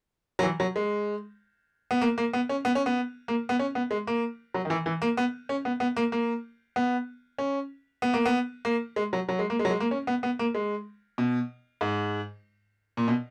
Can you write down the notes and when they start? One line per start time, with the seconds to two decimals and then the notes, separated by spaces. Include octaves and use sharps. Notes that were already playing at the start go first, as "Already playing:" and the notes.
0.39 F#3
0.43 E3
0.60 F#3
0.76 G#3
1.91 B3
2.01 A#3
2.18 A#3
2.33 B3
2.49 C#4
2.65 B3
2.75 C#4
2.86 B3
3.28 A#3
3.49 B3
3.59 C#4
3.75 B3
3.91 G#3
4.07 A#3
4.54 F#3
4.65 D#3
4.70 E3
4.86 E3
5.02 A#3
5.17 B3
5.49 C#4
5.65 B3
5.80 B3
5.96 A#3
6.12 A#3
6.76 B3
7.38 C#4
8.02 B3
8.14 A#3
8.26 B3
8.65 A#3
8.96 G#3
9.13 F#3
9.29 F#3
9.39 G#3
9.50 A#3
9.59 G#3
9.65 F#3
9.70 G#3
9.80 A#3
9.91 C#4
10.07 B3
10.23 B3
10.39 A#3
10.55 G#3
11.18 B2
11.81 G#2
12.97 A#2
13.08 B2